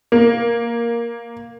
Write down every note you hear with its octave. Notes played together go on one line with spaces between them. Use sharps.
A#3